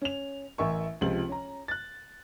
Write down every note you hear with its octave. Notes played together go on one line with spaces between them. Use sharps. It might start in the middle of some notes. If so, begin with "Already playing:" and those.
C#4 F7
A1 A#4 E5 G#5 C#6
C#2 C3 F3 F#7
C#4 A#5
F#6 A6